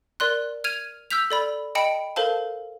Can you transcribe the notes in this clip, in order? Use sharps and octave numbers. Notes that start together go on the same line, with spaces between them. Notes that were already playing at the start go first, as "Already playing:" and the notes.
A#4 D5 C6 F#6
F6 G#6 D#7 F7
E6 F6 G6 B6 F7
A4 D5 B5
D#5 G5 A5 B5 C#7 D7
A4 A#4 C5 F5 A5